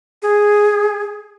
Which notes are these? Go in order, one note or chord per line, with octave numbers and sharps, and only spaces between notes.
G#4